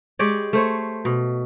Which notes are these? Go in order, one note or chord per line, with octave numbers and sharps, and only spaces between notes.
G#3 G4 C#5 D5
A3 C5 C#5
B2